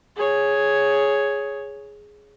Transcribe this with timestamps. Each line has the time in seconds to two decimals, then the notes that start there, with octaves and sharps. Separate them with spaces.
0.16 G#4 C#5